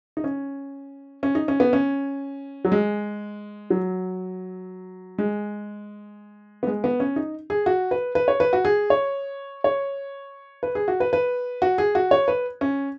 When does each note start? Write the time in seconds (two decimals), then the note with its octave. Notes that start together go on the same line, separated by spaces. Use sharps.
0.17 D#4
0.24 C#4
1.23 C#4
1.35 D#4
1.48 C#4
1.60 B3
1.73 C#4
2.65 F#3
2.72 G#3
3.70 F#3
5.18 G#3
6.63 B3
6.67 G#3
6.84 B3
7.00 C#4
7.16 D#4
7.50 G#4
7.66 F#4
7.91 B4
8.15 B4
8.28 C#5
8.40 B4
8.53 F#4
8.65 G#4
8.90 C#5
9.64 C#5
10.63 B4
10.75 G#4
10.88 F#4
11.00 B4
11.13 B4
11.62 F#4
11.78 G#4
11.95 F#4
12.11 C#5
12.28 B4
12.61 C#4